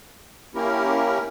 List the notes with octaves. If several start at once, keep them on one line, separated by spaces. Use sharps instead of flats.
A#3 C#4 E4 G4 A#4